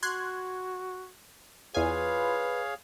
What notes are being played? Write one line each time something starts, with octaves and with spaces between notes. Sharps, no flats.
F#4 C6 F#6 G#6
E2 F4 G#4 B4 C#5 F5 G#5